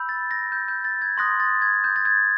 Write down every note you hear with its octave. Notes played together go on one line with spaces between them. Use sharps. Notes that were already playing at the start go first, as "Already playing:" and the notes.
Already playing: B5 E6 G6
A6
A#6
G6
G6
A6
G#6
C6 D#6 F#6 A#6
A6
G#6
G6
A6
G#6